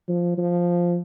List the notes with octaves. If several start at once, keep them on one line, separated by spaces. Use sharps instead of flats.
F3
F3